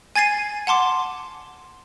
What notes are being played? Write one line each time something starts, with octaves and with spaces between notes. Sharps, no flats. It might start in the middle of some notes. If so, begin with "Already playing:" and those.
G#5 G#6 A6 C7 D#7
F#5 A5 C6 D6